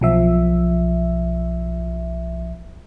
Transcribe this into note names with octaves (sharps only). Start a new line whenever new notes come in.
B1 F3 E5